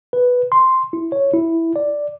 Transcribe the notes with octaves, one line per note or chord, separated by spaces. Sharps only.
B4
C6
E4
C#5
E4
D5